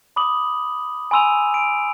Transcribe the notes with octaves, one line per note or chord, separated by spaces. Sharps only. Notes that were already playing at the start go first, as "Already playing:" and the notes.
B5 D6 D#6 F#7
G#5 B5 C6 E6 D#7 F7
D7